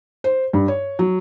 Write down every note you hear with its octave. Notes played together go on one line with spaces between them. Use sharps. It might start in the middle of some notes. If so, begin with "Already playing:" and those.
C5
G2
C#5
F#3